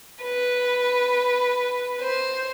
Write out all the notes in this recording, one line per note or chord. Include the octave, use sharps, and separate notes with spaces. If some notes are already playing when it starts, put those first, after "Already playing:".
B4
C5